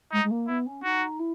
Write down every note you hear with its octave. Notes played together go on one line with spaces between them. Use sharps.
G#3 D#4
G#3
A#3
B3 E4
C#4
D#4 F#4
E4